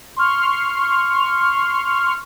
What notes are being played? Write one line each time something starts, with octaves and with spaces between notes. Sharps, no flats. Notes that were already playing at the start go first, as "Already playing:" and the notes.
C6 C#6 F6